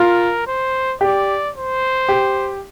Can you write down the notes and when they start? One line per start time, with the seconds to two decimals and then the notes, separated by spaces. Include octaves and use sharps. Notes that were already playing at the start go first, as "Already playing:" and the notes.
Already playing: F4 A#4
0.47 C5
1.01 G4 D5
1.55 C5
2.09 G4